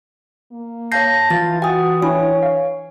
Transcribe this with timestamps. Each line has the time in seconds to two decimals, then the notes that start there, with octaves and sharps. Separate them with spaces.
0.51 A#3
0.92 C#5 F5 A5 G6 A#6 C7
1.30 E3 F4 A6
1.62 F#4 G5 G#5 D#6 A6
2.02 D4 E4 C#5 G#5
2.43 F5